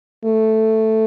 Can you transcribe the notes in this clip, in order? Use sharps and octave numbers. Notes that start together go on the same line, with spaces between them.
A3